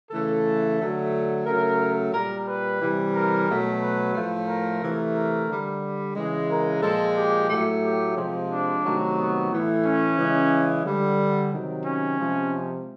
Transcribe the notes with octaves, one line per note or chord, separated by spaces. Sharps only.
C#3 E3 A3 A4
D3 F#3 A3
C#3 F#3 A3 A#4
A#2 G3 A#4
B4
C3 E3 G3
A#4
B2 F#3 A3
B4
A2 F3 A3
A#4
C3 E3 A3
A#4
D3 G3
C#3 E3 G#3
A#4
A#2 F3 G#3 A4
G4
A2 F#3 A3
G4
C3 F3 G#3
D4
C3 D#3 F#3 A3
B3
A2 E3 A3
C#4
C#3 E3 G#3
D3 G3
C3 D#3 F#3
C#4
C3 F3 G#3